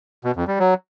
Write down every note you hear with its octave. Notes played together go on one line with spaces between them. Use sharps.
B2
F2
G3
F#3